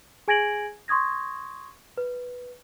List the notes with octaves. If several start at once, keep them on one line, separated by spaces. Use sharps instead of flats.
G#4 G#5 G#6 A#6 D7 F#7
C6 C#6 D#6 G#6 A#6
B4